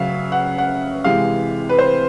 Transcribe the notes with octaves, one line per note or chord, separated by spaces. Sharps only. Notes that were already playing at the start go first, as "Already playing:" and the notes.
Already playing: C#3 F#3 E5 F5
F#5
F#5
C3 E3 G#3 F5
B4
C5